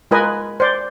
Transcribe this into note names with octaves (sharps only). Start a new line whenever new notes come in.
G#3 F4 A#4 B4 D#5 G#5
C5 D5